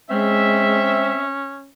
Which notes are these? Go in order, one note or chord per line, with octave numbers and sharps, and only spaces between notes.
G#3 C4 C#4 E5